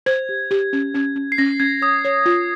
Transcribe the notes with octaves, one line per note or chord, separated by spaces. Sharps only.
C5 G#6
G4
G4
C#4
C#4
C#4
C7
C#4 A#6
C#4 G#6
C#5 D#6
C#5
F4